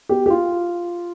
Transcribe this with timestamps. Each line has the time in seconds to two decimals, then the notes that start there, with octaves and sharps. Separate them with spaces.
0.09 B3 G4
0.26 G4
0.30 F4